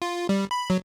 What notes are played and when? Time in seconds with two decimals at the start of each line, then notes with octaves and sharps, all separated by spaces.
0.02 F4
0.29 G3
0.51 B5
0.70 F#3